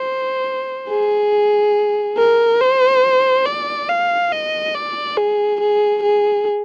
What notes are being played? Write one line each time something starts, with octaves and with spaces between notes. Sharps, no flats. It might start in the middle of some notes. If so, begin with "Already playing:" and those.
Already playing: C5
G#4
A#4
C5
D5
F5
D#5
D5
G#4
G#4
G#4